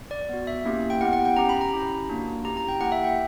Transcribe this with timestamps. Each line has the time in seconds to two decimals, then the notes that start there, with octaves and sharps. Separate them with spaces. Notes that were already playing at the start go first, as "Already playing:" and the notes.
0.11 D5
0.29 B3 F#4
0.47 E5
0.65 A#3 C#4 E4 G4
0.90 G5
1.01 B3 E4 G4 F#5
1.13 F#5
1.25 G5
1.36 C#4 G4 A#5
1.49 B5
1.61 A#5
1.73 C#4 E4 G4
2.09 A#3 D4 F#4
2.45 C#4 E4 G4 A#5
2.57 A#5
2.68 G5
2.81 A#3 E4 G4 F#5
2.92 E5
3.04 G5